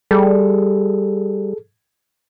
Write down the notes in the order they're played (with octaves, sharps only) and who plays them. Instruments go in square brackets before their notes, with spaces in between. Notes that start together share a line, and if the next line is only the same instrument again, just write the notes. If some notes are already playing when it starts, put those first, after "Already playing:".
[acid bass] G3 [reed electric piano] G#4 A4